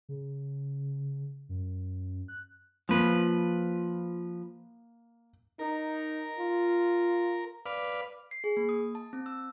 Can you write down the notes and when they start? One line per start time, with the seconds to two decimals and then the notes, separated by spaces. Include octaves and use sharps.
0.09 C#3
1.49 F#2
2.28 F#6
2.89 F3 A#3 B4
5.59 D#4 A#4
6.38 F4
7.66 B4 D5 F5
8.31 C7
8.44 G#4
8.57 A#3
8.69 D#6
8.95 A5
9.13 C4
9.26 E6